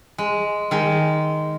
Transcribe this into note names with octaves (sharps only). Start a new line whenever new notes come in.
G#3
D#3 G#3